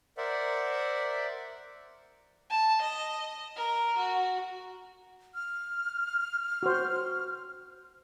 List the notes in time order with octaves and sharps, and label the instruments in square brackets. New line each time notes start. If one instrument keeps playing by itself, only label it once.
[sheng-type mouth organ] A#4 C5 D5 E5 F#5
[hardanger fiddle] A5
D#5
A#4
F#4
[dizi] F6
[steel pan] F#4 C5